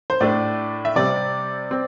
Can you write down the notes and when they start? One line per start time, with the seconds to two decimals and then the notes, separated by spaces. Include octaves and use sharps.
0.10 C5
0.20 A2 A3 D4 D5
0.85 E5
0.95 C3 G3 C4 D5
1.71 C4